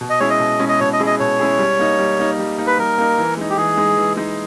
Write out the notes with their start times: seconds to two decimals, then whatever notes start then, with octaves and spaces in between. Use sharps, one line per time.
0.01 B2
0.10 D#5
0.20 G#3 C#4 E4 G#4 C#5
0.30 D#5
0.40 B2
0.60 G#3 C#4 E4 G#4
0.69 D#5
0.80 B2 C#5
0.93 D#5
1.00 G#3 C#4 E4 G#4
1.06 D#5
1.20 B2 C#5
1.39 G#3 C#4 E4 G#4
1.59 G3
1.79 A#3 D#4
1.99 G3
2.19 A#3 D#4
2.39 G3
2.58 A#3 D#4
2.67 B4
2.78 G3 A#4
2.98 A#3 D#4
3.18 E3
3.37 G#3 D#4
3.50 G4
3.57 E3 G#4
3.77 G#3 D#4
3.98 E3
4.17 G#3 D#4